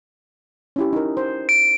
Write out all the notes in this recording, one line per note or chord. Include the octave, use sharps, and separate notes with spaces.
C#4 E4 G4
D#4 A#4
C5
D7